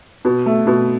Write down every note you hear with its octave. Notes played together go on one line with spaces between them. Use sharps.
B2
A3
B2